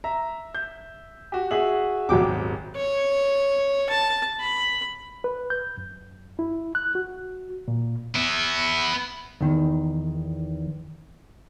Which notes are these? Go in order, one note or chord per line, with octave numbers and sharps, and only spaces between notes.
E5 A#5
G6
F#4 G4
F#4 G#4 E5 F#7
D#1 G#1 F#3 G5 D6
C#5
A5
B5
B4
G6
F#2
E4
F#6
F#4
A#2
B3 E4
E2 D#3